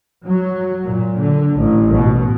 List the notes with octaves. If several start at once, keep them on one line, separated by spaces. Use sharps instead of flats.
F#3
A#2
D3
A1
B2